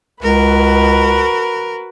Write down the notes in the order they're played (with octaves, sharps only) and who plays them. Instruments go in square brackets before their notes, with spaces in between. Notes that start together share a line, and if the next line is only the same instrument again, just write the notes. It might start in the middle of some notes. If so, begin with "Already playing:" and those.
[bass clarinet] C#2 [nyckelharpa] F#4 B4 [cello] A#4